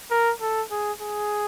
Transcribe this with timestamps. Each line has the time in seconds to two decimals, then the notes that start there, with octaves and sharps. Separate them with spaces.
0.11 A#4
0.41 A4
0.71 G#4
1.01 G#4